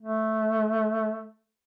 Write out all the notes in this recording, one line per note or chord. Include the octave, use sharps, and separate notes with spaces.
A3